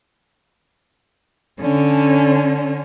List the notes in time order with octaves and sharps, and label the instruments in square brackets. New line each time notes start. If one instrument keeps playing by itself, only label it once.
[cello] D3 C#4